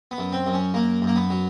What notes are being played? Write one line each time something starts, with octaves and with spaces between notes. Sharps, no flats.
B3
F#2
C4
F#2
C#4
F#2 A#3
F#2
A#3
B3
F#3